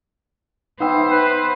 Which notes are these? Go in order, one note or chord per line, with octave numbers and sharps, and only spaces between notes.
B3 D#4 C5 E5 F#5 G5
B4